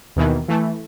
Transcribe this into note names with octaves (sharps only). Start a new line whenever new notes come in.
D#2 B2 D#3 E3
E3 A3